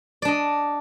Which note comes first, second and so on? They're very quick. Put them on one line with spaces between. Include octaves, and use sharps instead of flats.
D5 D4 D#5